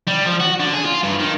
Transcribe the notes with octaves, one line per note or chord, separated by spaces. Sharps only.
G3
F3
F#4
D3
G#4
F4
G2
D#3